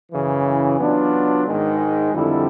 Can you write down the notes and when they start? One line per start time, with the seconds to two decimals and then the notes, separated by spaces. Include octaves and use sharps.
0.12 F#2 C#3 E3
0.78 F#3 B3 D4 F4
1.46 G#2 D#3 G#3
2.14 F2 D3 G3 C4 E4